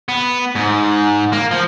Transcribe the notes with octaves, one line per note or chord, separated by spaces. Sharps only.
B3
G#2
A#3
F3